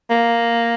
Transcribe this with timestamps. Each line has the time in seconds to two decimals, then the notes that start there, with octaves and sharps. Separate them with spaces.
0.10 A#3